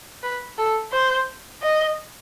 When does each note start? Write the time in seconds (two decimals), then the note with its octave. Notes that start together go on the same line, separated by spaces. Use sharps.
0.23 B4
0.58 A4
0.92 C5
1.63 D#5